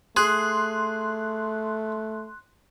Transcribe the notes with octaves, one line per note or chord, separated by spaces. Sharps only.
A3 G#4 C6 F#6